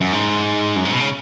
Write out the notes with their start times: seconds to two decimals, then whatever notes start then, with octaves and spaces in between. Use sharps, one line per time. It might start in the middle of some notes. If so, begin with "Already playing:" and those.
0.01 F#2
0.13 G#2
0.76 F#2
0.85 G#2
0.92 B2
1.00 C#3